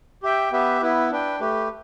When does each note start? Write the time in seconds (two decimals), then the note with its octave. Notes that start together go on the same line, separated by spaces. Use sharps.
0.23 G4 E5 G5
0.52 B3 G4 B4 E5
0.81 B3 E4 B4
1.11 D4 B4 G5
1.40 A3 G4 B4